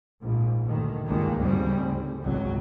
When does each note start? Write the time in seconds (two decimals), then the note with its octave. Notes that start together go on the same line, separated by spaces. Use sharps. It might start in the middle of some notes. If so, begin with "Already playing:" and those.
0.22 A#1 G#2
0.64 D2 G2 D#3
1.06 C#2 G2 D#3 G#3 A#3
1.40 D2 G#2 C#3 G3 C4
1.77 D2
2.22 G#1 C#2 C3 F#3